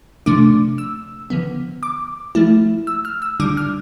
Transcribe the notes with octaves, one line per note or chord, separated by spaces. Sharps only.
C3 F3 A3 D4 D6
E6
D3 F3 B3
D6
F3 A3 E4
E6
F6
E6
D3 G3 D4 D6
F6